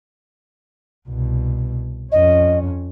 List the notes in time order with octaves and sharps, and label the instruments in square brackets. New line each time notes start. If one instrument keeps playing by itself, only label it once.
[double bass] C2 B2
[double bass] F2 C#4 [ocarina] D#5